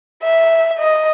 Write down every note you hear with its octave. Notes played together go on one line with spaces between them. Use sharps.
E5
D#5